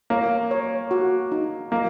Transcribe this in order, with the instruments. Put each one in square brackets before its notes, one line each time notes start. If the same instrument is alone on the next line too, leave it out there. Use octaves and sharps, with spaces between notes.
[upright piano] A#3 [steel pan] C#5
[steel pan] C#5
F#4
D#4
[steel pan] F#3 [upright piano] A#3